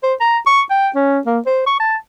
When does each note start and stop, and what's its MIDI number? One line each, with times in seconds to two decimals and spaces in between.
0.03 0.14 72
0.21 0.38 82
0.47 0.61 85
0.71 0.89 79
0.95 1.19 61
1.26 1.39 58
1.46 1.65 72
1.67 1.77 85
1.80 1.96 81